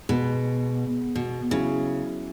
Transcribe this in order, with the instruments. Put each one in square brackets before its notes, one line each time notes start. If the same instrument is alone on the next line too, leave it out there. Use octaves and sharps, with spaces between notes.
[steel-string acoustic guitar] B2 [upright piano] G#3 B3 G#4
[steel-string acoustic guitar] B2
[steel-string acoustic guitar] C#3 [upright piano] F#3 C#4 E4 G#4